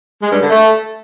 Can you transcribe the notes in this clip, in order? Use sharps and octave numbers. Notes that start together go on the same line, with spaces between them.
G#3
G2
D3
A3